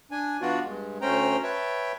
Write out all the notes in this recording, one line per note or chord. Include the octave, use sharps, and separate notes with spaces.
D4 G#5
E3 B3 D4 F4 F#4 D5
G2 G#3
D2 A3 C#4 C5 G5 A#5
B4 C#5 E5 G5 A5